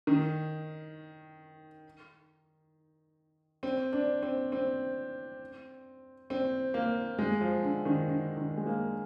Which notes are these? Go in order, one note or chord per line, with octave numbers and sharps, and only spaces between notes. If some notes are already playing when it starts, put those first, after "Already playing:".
D#3
C4
D4
C4
C4
C4
A#3
G#3
F3
D3
D#3
D3
D#3
G#3
A#3